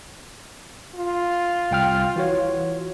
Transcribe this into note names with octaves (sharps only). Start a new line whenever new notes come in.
F4
C2 G5 F6
E3 F#4 C#5